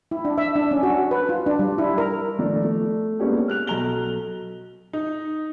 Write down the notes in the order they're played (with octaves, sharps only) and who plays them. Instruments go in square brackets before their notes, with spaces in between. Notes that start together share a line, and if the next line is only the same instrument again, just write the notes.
[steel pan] E4
D4
E5
D4
C#4
F#4
B4
F4
D4
G3
E4
A#4
[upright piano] D#3 F3 A3 D4
A3
G#3 A#3 B3 C#4 D4 G4
F6 F#6 F7
B1 A4 A#5 F7 G7
D#4